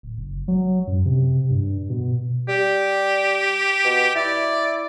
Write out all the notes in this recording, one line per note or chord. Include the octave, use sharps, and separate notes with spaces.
D1
F#1
F#3
F#2
C3
G2
B2
G3 G4
B2
E4 D5